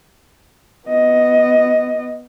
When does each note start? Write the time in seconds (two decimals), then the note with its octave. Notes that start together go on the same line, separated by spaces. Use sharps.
0.88 B3 D#5